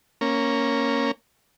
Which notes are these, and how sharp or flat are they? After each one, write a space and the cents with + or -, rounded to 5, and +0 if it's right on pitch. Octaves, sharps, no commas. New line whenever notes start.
A#3 +0 C#4 +0